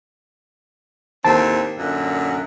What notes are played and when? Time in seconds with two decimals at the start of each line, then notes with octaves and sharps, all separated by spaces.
1.25 D#2 A2 C4 A5
1.78 F#2 A#2 D3